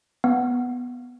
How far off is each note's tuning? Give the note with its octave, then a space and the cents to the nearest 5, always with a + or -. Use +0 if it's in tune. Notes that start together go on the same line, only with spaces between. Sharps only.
B3 +0 F5 +0